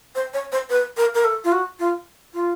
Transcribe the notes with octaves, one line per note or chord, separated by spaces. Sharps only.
C5
C#5
C5
B4
A#4
A#4
A4
F4
F#4
F4
F4